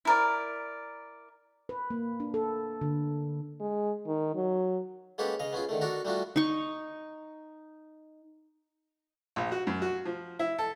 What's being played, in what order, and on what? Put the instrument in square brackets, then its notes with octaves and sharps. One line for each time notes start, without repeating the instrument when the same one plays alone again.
[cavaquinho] E4 A#4 D5
[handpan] B4
A#3
D4
A4
D3
[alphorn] G#3
D#3
F#3
[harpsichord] G#3 A#3 B3 C#4 G4 A4
C#3 D#5 F5
B3 C#4 F4 G#4
D3 D#3 A3
D4 F#4 A4 A#4
G3 A3 D4 F4 F#4
[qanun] D#4 C#6
[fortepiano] A#1
F#4
F#2
F#4
F3
E4
A4